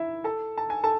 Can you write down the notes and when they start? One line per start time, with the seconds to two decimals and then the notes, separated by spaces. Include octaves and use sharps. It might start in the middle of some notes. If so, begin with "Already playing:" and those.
Already playing: E4 E5
0.24 A4 A5
0.58 A5
0.70 G#5
0.83 A4 A5